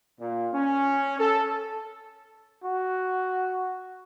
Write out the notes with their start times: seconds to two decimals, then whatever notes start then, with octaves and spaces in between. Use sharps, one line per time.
0.19 A#2
0.52 C#4
1.19 A4
2.64 F#4